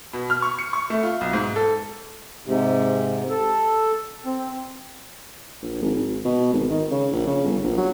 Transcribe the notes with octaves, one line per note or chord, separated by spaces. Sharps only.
B2
F6
C#6
C#7
C#6
A3
F4
B1
G#2
A4
G#2 C3
A4
C4
A#1
G#1
G#1
B2
G#1
D#3
C#3
A#1
C#3
G1
A#1
F#3